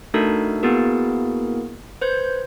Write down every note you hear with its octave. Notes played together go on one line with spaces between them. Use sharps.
A3 D4 D#4 F#4 A4 A#4
A#3 B3 E4 F#4 G#4 A#4
B4 C5 G6 G#6